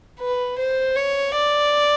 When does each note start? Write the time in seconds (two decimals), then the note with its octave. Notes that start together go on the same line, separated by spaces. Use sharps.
0.20 B4
0.59 C5
0.96 C#5
1.35 D5